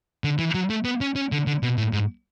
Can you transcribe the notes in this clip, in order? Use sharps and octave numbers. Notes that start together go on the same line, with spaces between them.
D3
E3
F#3
A3
B3
C#4
C#4
D3
D3
B2
A2
G#2